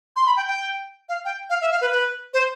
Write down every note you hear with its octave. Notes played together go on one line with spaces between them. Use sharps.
C6
B5
G5
G5
F5
G5
F5
E5
F5
B4
B4
C5